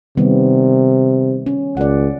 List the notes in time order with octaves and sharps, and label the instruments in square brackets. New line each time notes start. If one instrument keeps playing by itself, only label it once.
[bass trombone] C3 [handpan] D#3 G3 B3
[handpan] C#4
[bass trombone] C#2 [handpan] D5 F#5